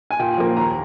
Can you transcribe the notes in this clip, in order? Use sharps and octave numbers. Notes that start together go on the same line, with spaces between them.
G#5
A#2 G5
F3 A#3
D#2 A#5